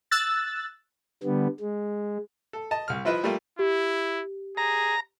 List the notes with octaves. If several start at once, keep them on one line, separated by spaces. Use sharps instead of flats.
E6 F#6 A6
D3 G3 B3
G#3
A4
D#5 A5
C2 F6
F3 E4 F4 B4 D#5 E5
G3 A3 A#3 F4 G4
E4 G4
G#4 A#5